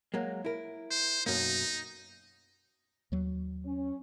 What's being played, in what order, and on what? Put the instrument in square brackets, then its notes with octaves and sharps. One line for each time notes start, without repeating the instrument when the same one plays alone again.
[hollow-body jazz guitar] F#3 G#3 A#3
E4 A#4
[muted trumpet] C5
[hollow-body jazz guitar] B1 F#2 A#3 [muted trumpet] D#4
[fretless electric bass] D#2 F#3
[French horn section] C#4